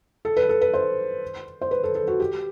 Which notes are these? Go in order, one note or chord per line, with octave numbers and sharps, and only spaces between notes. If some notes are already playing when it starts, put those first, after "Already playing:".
A4
B4
A4
B4
C5
C5
B4
A4
A4
F#4
G4